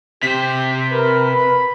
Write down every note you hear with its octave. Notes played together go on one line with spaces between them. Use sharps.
C3 G4 C5 B6
A#4 B4
B5